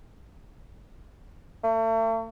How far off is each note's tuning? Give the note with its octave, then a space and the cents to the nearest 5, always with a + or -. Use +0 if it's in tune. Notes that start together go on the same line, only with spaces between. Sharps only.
A3 +40